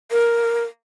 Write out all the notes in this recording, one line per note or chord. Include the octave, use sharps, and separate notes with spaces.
A#4